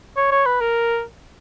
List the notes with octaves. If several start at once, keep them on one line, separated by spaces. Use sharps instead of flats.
C#5
C#5
B4
A#4